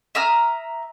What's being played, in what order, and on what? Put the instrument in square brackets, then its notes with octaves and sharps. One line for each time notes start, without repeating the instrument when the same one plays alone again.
[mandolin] E5 A#5 D#6 F6